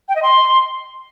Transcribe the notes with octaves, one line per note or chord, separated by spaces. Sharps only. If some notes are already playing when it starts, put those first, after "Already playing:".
G5
D#5
C6